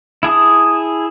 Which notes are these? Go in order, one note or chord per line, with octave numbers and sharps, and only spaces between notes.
E4 G#4 A5 D#6